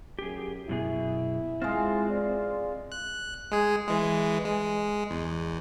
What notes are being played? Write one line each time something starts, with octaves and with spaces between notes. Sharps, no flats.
F#2 G4 G#4
F#2 B2 E4 G#4
G#3 C4 F4
D5
F#6
G#3 G#4
E3 G#3
G#3
E2